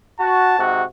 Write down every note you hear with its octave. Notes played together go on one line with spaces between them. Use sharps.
F#4 A5
G#2 C3 F#4